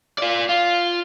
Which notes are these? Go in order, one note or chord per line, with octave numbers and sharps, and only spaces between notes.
F4 D5
F4